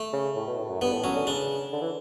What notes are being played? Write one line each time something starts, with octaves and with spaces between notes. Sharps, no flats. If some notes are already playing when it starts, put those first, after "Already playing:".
Already playing: A3
C#3
A2
B2
A2
F#2
G2 B3
A2
F#3 C#4
D3
C#3 D4
D3
E3